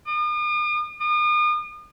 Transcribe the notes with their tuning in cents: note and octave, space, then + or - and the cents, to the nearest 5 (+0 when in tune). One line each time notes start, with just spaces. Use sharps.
D#6 -45
D#6 -40